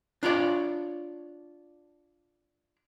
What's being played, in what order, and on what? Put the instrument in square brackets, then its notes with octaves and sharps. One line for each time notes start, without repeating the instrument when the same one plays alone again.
[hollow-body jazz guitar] D4 F4 C#5 D5